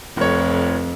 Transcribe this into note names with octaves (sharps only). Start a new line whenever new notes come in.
F1 F2 C#5